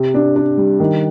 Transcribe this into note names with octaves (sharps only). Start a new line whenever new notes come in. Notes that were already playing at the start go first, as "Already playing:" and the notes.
Already playing: C3
D4
D4
G3
D#3